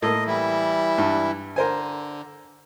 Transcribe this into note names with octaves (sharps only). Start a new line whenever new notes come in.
A2 A#3 D#5
E3 G3 E4
G2
D3 A#4 C5 G#5